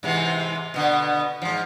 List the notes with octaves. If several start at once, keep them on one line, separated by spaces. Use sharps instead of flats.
G#2 C3 E3
B2 D3 B3
G#2 F3